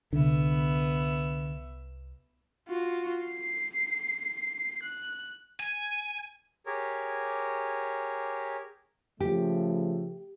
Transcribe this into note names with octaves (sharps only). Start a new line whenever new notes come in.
C2 D3 B3 E5
F4 F#4
C7
F#6
G#5
G4 G#4 A#4 C#5
C#3 F3 A3 G4